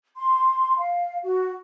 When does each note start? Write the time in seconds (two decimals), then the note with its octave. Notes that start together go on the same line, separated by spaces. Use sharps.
0.16 C6
0.78 F5
1.23 F#4